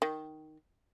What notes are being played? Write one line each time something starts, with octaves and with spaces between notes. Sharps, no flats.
D#3